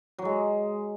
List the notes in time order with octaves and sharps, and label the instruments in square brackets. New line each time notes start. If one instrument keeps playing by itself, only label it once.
[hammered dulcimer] F#3
G#3